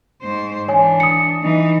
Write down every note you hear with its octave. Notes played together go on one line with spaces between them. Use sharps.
G#2 C5
E3 D4 C#5 G#5
D#6 C#7
E3 D#4